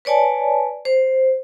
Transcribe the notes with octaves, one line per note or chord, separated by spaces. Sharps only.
B4 C#5 D5 G#5 A5
C5